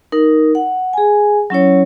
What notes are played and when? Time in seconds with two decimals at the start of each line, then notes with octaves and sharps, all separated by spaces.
0.12 D#4 A#4
0.55 F#5
0.93 G#4 G#5
1.50 F#3 C#4 E4 C#5